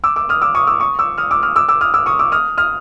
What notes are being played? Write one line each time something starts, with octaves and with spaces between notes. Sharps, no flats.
D6 E6
D6 E6
D#6 F6
D6 E6
C#6 D#6
D6 E6
C#6 D#6
D6 E6
D#6 F6
D6 E6
D#6 F6
D6 E6
D6 E6
D#6 F6
D6 E6
C#6 D#6
D6 E6
D#6 F6
D#6 F6